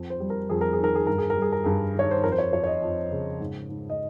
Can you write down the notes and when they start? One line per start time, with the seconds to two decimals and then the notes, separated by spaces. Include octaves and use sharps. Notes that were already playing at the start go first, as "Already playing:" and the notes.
Already playing: F2
0.10 C5
0.20 G3
0.30 A#4
0.50 F2 G#4
0.61 A#4
0.73 G#4
0.79 D#3
0.84 A#4
0.95 G#4
1.07 G2 A#4
1.18 G#4
1.30 A#4
1.36 G3
1.42 G#4
1.52 A#4
1.64 G2 G#4
1.95 D#3 C#5
2.11 C5
2.23 F2 A#4
2.32 C5
2.38 C#5
2.53 F3 C#5
2.64 C#5
2.67 D#5
2.82 F2
3.11 C#3
3.40 G#2
3.69 G#2
3.90 D#5